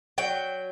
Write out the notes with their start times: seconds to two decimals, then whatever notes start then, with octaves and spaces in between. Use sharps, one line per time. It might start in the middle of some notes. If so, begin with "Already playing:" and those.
0.18 F#3 G5